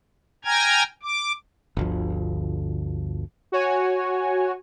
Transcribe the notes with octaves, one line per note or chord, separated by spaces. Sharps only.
G5 G#5 A#5 F6 G#6
D6
G1 D2 F3
F#4 C#5 G#5